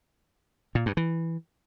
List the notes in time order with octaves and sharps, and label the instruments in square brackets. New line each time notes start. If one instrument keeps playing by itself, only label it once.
[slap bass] A#2
G2
E3